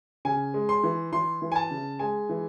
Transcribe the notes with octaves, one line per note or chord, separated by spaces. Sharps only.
C#3 G#5
G#3
C6
E3
E3 C6
E3
G#5
A5
C#3
G#3 G#5
E3